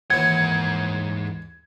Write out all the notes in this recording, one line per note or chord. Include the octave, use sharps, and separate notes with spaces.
D#2 G#2 E3 F#5 G#6